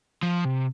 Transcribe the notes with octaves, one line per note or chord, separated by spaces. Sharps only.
F3
C3